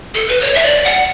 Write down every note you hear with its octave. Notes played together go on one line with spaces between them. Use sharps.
A4
B4
C#5
E5
D5
F#5